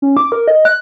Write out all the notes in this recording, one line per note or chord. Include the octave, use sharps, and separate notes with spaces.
C#4
D6
A#4
D#5
F#6